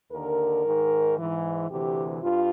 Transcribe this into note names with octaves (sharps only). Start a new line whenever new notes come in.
D#2 D3 A#4
G#2 D#3
G#2 E3
D2 C3 E3 G4
G2 F4